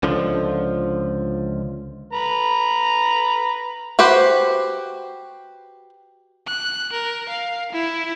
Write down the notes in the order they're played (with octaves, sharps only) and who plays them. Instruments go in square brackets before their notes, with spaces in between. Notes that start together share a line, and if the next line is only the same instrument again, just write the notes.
[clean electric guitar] C#2 D3 F3
[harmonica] B4 A#5
[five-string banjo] F#4 G4 B4 C5
[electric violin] F#6
A#4
F5
E4